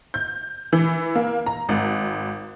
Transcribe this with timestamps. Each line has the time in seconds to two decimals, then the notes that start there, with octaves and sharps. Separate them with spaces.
0.14 G6
0.73 E3
1.15 A#3
1.46 A#5
1.69 G#1